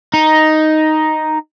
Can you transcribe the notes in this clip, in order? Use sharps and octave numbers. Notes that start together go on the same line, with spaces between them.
D#4